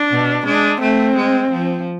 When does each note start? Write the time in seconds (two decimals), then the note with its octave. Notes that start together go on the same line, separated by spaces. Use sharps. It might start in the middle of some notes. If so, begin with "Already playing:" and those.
Already playing: D4
0.11 B2
0.46 G#3 D4
0.80 A3 C4
1.16 G#3
1.51 F3